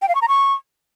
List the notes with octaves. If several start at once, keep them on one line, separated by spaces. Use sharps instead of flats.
G5
F5
C#6
A#5
C#6